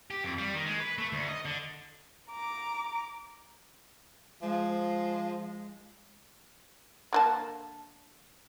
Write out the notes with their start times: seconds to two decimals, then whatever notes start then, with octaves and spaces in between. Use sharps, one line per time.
0.11 G4
0.23 F2
0.38 G3
0.54 D#3
0.66 G#3
0.80 B4
0.98 A3
1.12 D2
1.29 D#5
1.45 D3
2.30 A#5 D6
4.42 F3 G#3
7.13 D3 A#3 A5